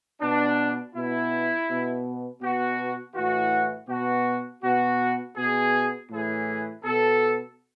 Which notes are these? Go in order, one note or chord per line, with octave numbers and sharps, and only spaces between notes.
B2 D4
B2 E4
B2
B2 F#4
A2 E3 F#4
B2 F#4
B2 F#4
B2 G#4
A2 E3 G#4
B2 A4